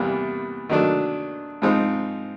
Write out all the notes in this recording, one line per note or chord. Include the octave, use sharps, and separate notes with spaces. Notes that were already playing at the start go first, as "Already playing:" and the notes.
Already playing: E2 C3 E3 G3 A#3
D#3 F#3 A3 D4
G#2 F3 G#3 C4 D#4